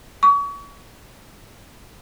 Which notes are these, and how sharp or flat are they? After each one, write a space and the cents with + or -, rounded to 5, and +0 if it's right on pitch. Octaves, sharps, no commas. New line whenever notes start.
C#6 +35